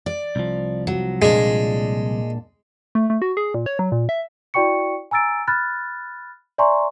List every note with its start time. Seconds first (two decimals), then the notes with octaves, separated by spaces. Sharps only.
0.06 D5
0.36 C2 F3
0.87 F#3
1.22 A#2 G#3 D4
2.95 A3
3.10 A3
3.22 F#4
3.37 G#4
3.54 A#2
3.66 C#5
3.79 F#3
3.92 A#2
4.09 E5
4.54 E4 F#4 D5 G5 C#6 C#7
5.11 G#5 A#5 E6 A6 D7
5.48 B5 F6 F#6 A6
6.58 D5 E5 G#5 A#5 C6 C#6